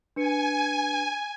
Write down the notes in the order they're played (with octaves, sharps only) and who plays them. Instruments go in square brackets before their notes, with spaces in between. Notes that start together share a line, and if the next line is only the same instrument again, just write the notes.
[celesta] D4 B4 C#7 [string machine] G#5